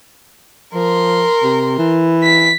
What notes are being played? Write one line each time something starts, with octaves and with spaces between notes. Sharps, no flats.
F3 A#4 C6
C3
E3
B6